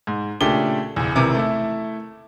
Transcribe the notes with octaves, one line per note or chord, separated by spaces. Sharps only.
G#2
A#2 C#3 A3 D4 G4 G7
F#1 E2
G#1 C3 E3 A#4
A3 E4